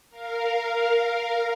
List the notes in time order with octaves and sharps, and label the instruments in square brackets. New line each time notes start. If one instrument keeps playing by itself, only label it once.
[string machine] A#4 F5